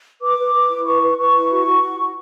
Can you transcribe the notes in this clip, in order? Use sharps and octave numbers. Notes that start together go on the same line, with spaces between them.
B4 D6
B4
B4
E4
B4 C#6
B4
B4 C#6
E4
F#4
F#4
F#4
F#4